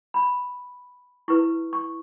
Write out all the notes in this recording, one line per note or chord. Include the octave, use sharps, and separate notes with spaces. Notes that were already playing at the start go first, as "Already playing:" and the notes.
B5
E4 B4 C#6
C#6